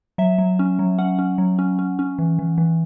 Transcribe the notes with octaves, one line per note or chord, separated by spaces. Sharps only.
F#3 E5
F#3
C#4
F#3
C#4 F#5
C#4
F#3
C#4
C#4
C#4
E3
E3
E3